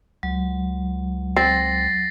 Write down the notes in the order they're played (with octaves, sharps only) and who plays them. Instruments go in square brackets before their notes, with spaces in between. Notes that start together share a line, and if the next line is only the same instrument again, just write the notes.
[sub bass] C#2 [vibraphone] F#3
[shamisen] C4 [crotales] A6 A#6 C7